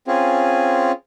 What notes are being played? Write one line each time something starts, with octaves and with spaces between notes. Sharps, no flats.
C4 C#4 F4 G#4